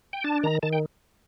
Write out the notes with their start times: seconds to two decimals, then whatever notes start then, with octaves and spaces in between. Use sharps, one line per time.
0.13 G5
0.24 D4 A5
0.43 D#3 A#5
0.62 D#3 A5
0.73 G5